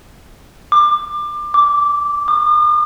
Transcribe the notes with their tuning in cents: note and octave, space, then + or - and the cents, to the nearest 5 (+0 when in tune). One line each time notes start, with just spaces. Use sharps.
D6 +25
D6 -10
D#6 -45